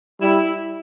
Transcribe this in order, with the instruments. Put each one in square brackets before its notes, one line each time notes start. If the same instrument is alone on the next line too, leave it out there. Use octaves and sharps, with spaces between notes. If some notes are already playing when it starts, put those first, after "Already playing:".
[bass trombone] G3 [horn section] E4